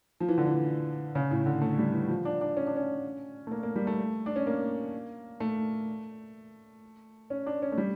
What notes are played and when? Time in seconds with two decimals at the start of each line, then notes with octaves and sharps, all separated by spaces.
0.20 F3
0.29 E3
0.38 D3
0.46 E3
1.15 C#3
1.31 A2
1.46 D3
1.62 A3
1.78 G3
1.93 E3
2.09 F3
2.25 D4
2.41 D4
2.57 C#4
2.67 D4
2.76 C#4
3.47 A3
3.51 A#3
3.63 A#3
3.76 G3
3.87 A3
4.26 D4
4.36 C#4
4.47 A#3
5.40 A3
7.30 C#4
7.46 D4
7.62 C#4
7.72 A3
7.78 G3